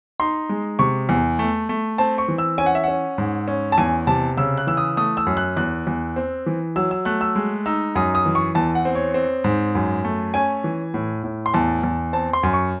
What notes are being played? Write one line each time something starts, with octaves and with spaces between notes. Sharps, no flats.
D#4 C6
G#3
C3 C#6
E2
A3
A3
C4 A5
C#6
E3
E6
C#4 G#5
F#5
E5
C#4 F#5
G#2
C#4
A5
E2 G#5
C3 A5
C#3 E6
F#6
E3 E6
D#6
A3 D#6
E6
F#2
F#6
E2 F#6
E2
C4
E3
F#3 E6
E6
A3 F#6
E6
G#3
D#4 E6
F#2 D#6
D#6
E3
C#6
E2 A5
F#5
C4
C#5
C4
G#2
F#2
A3
C#4 G#5
E3
A2
A2
C6
E2 A5
E2
C4 A5
C6
F#2
C#6